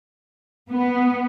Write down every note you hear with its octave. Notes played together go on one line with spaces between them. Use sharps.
B3